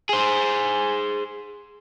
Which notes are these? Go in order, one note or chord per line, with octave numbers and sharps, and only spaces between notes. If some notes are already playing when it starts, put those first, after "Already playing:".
G#4 C5